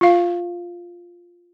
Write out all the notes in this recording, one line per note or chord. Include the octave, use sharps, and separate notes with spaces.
F4 F5